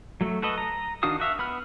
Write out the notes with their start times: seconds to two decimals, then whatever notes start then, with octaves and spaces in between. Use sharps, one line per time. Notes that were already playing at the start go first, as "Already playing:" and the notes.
0.21 F#3 A3
0.42 F#4 A4 B4 D#5
0.58 A#5
1.03 D#3 D4 F#4 F5 D#6
1.20 F#4 E5 F5
1.39 B3 B5 F6